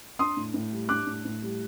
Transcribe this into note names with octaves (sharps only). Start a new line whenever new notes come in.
D4 C6 D#6
A2
A2
G3
D4 D6 F#6
A2
A2
G3